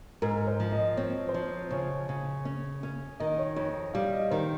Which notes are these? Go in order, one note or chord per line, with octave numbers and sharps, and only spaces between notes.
G#2 A#4
C5
F3
D#5
C4 C#5
C5
F3 C#5
C#3 C#5
C#3
C#4
C#4
D#3 D#5
C#5
F2 C#5
G3 F5
D#5
D#3 C5